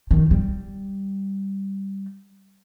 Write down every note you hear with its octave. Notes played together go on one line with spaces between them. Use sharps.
D#3
G3